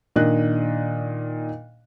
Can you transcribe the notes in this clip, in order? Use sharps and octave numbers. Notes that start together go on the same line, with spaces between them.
A#2 D#3 D4 D#5 F#6